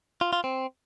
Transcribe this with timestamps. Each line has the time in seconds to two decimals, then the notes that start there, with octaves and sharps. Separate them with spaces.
0.21 F4
0.33 F4
0.44 C4